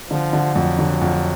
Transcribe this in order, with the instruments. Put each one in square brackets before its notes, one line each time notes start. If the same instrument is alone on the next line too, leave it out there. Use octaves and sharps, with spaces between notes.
[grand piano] D3 [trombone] F3
[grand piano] D3
[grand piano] F2 [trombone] F#3
[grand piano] D3
F2